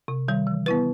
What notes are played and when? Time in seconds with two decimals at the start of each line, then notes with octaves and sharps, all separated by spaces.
0.08 C3
0.28 D#3 G3
0.47 E3
0.66 B3 E4 B4